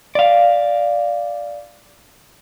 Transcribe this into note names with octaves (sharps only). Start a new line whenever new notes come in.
D5 F5